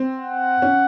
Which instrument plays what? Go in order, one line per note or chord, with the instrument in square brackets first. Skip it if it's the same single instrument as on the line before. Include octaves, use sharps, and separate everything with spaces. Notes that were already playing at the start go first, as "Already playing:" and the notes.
Already playing: [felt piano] C4
[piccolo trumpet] F#5
[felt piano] C#4